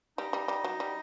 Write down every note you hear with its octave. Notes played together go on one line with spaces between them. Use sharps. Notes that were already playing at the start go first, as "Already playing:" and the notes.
G3 D#4 D#5
G3
G3
F#3
G3